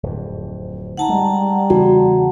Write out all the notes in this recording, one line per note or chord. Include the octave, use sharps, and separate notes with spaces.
D1 F2
D#4 F#5 A5 A#5
G3 G#3
E2 C#3 F#4